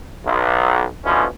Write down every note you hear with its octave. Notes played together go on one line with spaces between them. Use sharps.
B1
B2 D3 E3 F3 C#4